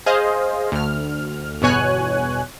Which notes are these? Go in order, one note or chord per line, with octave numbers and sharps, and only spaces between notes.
G#4 C5 D#5 F5
D2 F6
G1 E2 B2 C#5 G#5 F#6